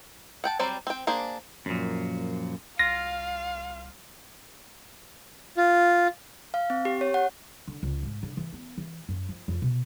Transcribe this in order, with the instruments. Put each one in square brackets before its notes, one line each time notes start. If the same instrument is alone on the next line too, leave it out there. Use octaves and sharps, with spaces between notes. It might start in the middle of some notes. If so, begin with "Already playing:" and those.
[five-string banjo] F#5 G5 A5
F#3 G3 C4 C5 D5
C4 G5
A#3 D4 G#4 C5
[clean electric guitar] F#2 A#2 [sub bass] F3
[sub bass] C2 [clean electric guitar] F4 [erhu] F5 [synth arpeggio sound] A#6
[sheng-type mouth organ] F4
[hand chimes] F5
C4
G4
C#5
F#5
[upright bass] D3
C#2
G#2
D3
E3
B3
E3
F#2
F3
F2
B2